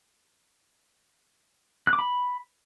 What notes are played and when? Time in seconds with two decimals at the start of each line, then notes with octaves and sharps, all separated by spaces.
1.87 F#6
1.93 D6
1.99 B5